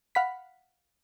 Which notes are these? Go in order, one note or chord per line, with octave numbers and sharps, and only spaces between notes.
F5 F#5 B5 B6